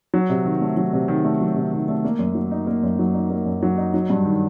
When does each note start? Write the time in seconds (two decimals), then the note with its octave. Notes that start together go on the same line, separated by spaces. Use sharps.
0.14 F#3
0.29 C3
0.45 D#3
0.61 A3
0.77 F#3
0.93 C3
1.08 D#3
1.25 A3
1.41 F#3
1.56 C3
1.72 D#3
1.88 A3
2.04 A#3
2.19 F#2
2.35 F#3
2.51 D#4
2.67 A#3
2.83 F#2
2.99 F#3
3.14 D#4
3.30 A#3
3.46 F#2
3.63 F#3
3.78 D#4
3.94 F#3
4.10 G2
4.25 D#3